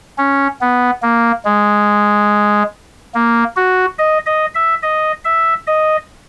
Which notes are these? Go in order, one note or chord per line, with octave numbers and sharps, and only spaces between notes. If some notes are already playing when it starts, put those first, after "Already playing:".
C#4
B3
A#3
G#3
A#3
F#4
D#5
D#5
E5
D#5
E5
D#5